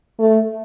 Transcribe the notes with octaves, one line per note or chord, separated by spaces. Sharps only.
A3